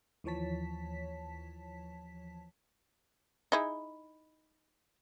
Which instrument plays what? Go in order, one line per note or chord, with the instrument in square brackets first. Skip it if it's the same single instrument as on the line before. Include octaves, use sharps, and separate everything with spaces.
[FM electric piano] D#2 E3 F3 C#5 A5 B6
[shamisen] D#4 E4 G#4